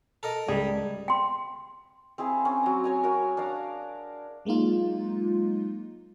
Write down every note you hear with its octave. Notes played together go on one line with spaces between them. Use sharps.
A4 A#4 D#5
C#2 G3 G#4
G5 C6
C4 E4 G#4 F5
C4 C#4
F#3 A#5
C#5 G#5 A#5
F#4 A#4
D4 F5 A#5 D6
F#3 G#3 A#3 D#4 F4